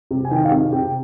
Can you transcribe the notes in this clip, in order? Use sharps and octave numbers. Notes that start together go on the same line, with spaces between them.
C3
G#5
D#3 G5
F5
C3
C3 G5